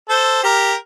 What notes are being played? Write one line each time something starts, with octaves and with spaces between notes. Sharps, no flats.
A4 C5
G4 A#4